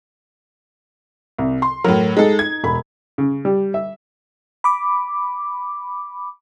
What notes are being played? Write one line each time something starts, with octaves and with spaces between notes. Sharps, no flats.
C2
C6
A2 F#3 A#4
G#3 D#4 A4
G#6
E1 B5
C#3
G3
E5
B5 D6